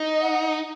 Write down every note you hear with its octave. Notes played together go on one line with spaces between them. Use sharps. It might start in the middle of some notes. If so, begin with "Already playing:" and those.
Already playing: D#4
D#5
F#5